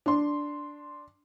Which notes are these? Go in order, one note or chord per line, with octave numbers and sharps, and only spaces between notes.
D4 C6